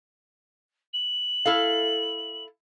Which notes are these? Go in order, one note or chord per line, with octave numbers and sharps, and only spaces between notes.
F#7
E4 A4 F5